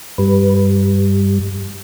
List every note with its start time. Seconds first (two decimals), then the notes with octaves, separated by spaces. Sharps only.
0.18 G2 G3 B4